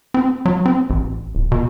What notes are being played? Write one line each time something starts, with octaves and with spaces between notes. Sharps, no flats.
C4
F#3
C4
A1
D1
B2